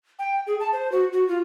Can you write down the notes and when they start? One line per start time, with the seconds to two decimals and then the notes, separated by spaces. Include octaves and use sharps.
0.19 G5
0.47 G#4
0.60 A5
0.73 C5
0.92 F#4
1.13 F#4
1.28 F4